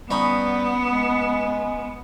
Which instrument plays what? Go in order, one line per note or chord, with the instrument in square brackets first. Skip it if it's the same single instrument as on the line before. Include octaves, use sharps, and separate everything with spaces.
[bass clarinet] G3 [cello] B3 [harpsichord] C#4 D#4 B5
[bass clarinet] G#3